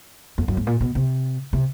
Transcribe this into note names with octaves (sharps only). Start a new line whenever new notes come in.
F2
F#2
G#2
A#2
B2
C3
C3